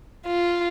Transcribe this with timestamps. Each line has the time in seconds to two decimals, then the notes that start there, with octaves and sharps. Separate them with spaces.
0.27 F4